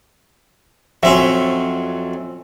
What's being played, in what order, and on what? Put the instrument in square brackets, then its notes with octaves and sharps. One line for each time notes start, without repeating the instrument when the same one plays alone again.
[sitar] F2 E5 [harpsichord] F#3 C4 C#4